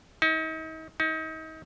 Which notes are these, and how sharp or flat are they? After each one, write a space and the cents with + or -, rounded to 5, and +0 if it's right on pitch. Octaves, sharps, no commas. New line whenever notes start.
D#4 +40
D#4 +35